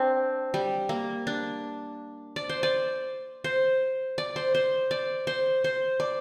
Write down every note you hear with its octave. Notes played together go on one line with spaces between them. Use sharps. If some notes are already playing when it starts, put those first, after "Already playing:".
Already playing: C4 D4
G3
A#3
D4
D5
C5
D5
C5
D5
C5
C5
D5
C5
C5
D5